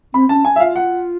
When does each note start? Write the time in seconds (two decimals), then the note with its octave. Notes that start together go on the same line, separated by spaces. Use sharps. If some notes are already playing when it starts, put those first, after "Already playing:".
0.14 C4 B5
0.29 C#4 A5
0.45 G#5
0.56 E5
0.60 F4 F5
0.76 F#5